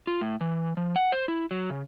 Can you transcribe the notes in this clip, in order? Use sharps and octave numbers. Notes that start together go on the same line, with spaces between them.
F4
A2
E3
F3
F#5
C5
E4
F#3
C#3